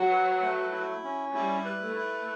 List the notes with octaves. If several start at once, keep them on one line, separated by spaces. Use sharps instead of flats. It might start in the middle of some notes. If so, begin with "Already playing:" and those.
Already playing: F#3 F#5
B4
A3
E4
C#4
G3 E4
B4
A3
E4